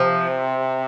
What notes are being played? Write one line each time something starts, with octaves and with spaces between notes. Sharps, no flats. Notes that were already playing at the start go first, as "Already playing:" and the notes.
Already playing: C3 F3